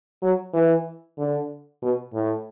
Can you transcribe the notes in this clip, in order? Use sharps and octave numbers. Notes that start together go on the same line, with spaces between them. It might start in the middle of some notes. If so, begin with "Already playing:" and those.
F#3
E3
D3
B2
A2